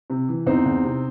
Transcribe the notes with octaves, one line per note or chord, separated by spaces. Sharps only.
C3
E3
E2 C4 D#4
E2
C3